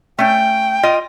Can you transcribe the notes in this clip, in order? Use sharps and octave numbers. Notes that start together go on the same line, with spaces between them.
A3 C#4 G5
F4 D#5